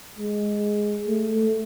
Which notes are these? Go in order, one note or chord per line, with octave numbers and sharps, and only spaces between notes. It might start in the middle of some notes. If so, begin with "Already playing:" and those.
G#3
A3